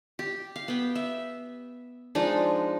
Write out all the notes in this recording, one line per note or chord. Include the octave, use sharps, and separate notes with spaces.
G4
F5
B3 G5
E5
F3 G#3 D4 D#4